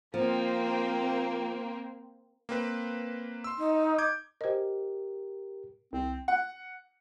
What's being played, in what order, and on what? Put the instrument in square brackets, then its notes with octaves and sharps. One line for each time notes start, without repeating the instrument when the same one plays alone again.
[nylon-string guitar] F3 [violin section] A#3 C4
[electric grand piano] A#3 C4 B4
C6 E6
[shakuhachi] D#4
[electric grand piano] D6 G6 G#6
[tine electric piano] G4 A#4 [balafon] C5 D#5
[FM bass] C2 [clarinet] C4
[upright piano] F#5